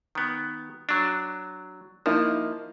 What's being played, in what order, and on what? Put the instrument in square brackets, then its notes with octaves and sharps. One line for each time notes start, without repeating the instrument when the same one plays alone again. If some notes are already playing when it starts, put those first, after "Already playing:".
[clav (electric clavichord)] D#3 B3
F#3 D4
[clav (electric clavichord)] F3 [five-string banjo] A#3 D#4 E4